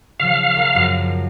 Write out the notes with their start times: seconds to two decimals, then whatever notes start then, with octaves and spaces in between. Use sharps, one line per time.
0.20 C#3 F3 F5
0.56 A#1 A#4 A#6
0.75 F#2 F3